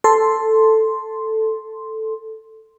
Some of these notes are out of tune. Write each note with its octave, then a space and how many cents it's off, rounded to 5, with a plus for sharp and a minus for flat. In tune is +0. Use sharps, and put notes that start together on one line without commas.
A4 +0 C6 +0